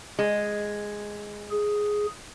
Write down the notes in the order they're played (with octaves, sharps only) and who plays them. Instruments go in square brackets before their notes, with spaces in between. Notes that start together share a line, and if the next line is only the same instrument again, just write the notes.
[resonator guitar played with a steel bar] G#3
[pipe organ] G#4